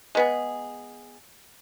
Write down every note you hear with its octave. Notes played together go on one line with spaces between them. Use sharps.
G#3 B3 G#4